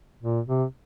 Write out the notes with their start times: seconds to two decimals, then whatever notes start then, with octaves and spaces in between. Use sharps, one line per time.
0.23 A#2
0.47 C3